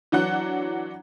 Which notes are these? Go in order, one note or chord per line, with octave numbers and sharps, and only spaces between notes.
E3 F#3 D4 F#4 F#5 F#6